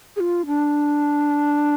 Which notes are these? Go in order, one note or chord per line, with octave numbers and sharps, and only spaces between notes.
G#4
F4
D4